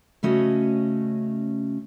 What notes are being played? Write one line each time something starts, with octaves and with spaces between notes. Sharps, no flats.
C#3 A3 C#4 F#4 D#5